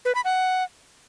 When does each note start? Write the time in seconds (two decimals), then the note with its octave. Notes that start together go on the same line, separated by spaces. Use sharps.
0.05 B4
0.15 B5
0.25 F#5